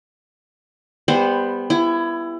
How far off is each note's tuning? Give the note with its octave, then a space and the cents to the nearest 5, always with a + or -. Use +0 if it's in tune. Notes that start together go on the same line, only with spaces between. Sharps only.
G3 +25 B3 +0 C5 +0
B3 +0 E4 +25